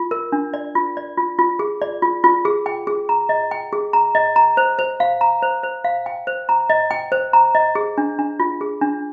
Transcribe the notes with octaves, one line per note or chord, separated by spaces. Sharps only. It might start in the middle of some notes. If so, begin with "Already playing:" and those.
Already playing: F4
A#4
D4
D5
F4
D5
F4
F4
G#4
D5
F4
F4
G#4
G5
G#4
A#5
D#5
G5
G#4
A#5
D#5
A#5
C5
C5
F5
A#5
C5
C5
F5
G5
C5
A#5
D#5
G5
C5
A#5
D#5
G#4
D4
D4
F4
G#4
D4